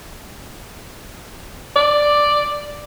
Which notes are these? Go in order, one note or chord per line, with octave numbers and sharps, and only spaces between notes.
D5